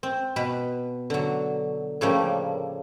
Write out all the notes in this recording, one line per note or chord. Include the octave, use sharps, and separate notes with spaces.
C4
B2 B4 B5
D3 F#3
A2 C#3 F3 G3 A3 A#3